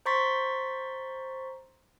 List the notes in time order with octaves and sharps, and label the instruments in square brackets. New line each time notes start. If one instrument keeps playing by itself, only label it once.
[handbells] C5 A#5 C6 C#6 A6 B6